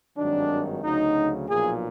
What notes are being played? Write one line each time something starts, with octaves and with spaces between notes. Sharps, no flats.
G#1 G2 D#3 F#3 D4
D2 C#3 F#3 D#4
B1 A#2 F3 G#4